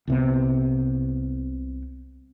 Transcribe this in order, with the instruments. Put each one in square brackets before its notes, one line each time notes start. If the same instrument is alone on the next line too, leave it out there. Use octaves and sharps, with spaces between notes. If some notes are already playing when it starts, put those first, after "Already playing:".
[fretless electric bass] C2 C3 B3